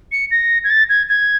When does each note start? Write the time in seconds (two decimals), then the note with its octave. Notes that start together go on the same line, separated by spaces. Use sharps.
0.12 C#7
0.31 A#6
0.64 G#6
0.70 A6
0.89 G#6
1.09 G#6